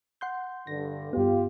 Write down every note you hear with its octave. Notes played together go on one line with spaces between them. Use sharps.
F#5 C6 G6
G2 D3 A#6
G2 B3 F4 G4